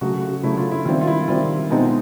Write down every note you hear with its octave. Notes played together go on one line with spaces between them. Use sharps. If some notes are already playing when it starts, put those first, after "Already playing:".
C#3 F#3 A3 F#4
F#4
C#3 F#3 A3 E4
F4
E4
D#3 G3 C4 F4
F4
E4
D#3 G3 C4 F4
B2 G#3 C4 D#4